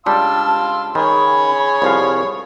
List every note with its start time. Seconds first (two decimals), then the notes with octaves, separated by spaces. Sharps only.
0.06 C#2 G3 D4 F5 A5 C6 E6
0.95 D#3 G#4 C#5 G#5 B5
1.82 C2 F3 F5